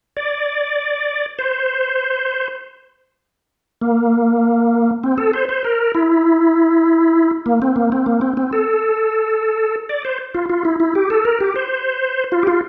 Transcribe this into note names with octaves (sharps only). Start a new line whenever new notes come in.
D5
C5
A#3
C4
A4
C5
C5
A#4
E4
A#3
C4
A#3
C4
A#3
C4
C4
A4
D5
C5
F4
F4
E4
E4
G4
A4
A#4
G4
C5
F4
G4
F4